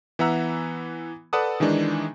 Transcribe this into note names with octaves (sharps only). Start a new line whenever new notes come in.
E3 B3 E5 F#5 A#5 E6
A4 B4 D5 F#5 A5 D#6
D#3 E3 G#3 D4 D#4